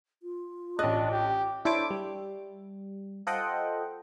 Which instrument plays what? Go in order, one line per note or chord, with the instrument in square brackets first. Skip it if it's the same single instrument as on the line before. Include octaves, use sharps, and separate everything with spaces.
[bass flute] F4
[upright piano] A1 F#6 [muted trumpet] D4 [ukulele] D#5
[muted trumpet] G4
[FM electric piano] D4 E4 A4 C5 C#5 D6
G3
F4 A4 C5 D#5 F#5 G5